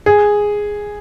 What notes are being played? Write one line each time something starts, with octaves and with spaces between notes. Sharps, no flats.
G#4